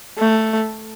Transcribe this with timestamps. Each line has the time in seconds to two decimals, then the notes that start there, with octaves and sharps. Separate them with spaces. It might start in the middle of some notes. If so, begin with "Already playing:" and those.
0.18 A3